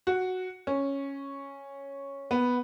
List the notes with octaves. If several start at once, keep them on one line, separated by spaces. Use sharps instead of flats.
F#4
C#4
B3